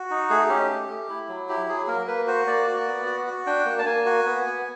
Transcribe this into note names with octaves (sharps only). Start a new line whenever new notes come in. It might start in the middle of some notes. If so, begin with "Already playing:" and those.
Already playing: F#4
D#4
A3 G#4
C#4 G4
A3
A3
E4
F#3
E4 G4
F#3 G#4
A#3 A#4
A#3 B4
F#4 C5
A#3 D5
F#4
B3
F#4
F#4
D4 G5
A#3
A5
A#3 G#5
F#4
B3
B3